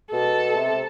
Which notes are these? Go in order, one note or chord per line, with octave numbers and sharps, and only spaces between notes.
B2 A4
C3